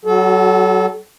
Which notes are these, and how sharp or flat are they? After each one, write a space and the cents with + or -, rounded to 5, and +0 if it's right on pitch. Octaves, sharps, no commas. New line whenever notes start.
F#3 +35 F#4 +0 A4 -25